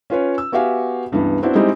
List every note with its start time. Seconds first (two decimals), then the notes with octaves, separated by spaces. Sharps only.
0.10 C#4 F4 B4 C#5
0.38 E6
0.52 B3 F#4 G4 E5 F5 G#5
1.11 C#2 G2 E3 B3
1.42 B3 C4 D4 E4 F#4 C5
1.55 G3 G#3 C4 D#4 E4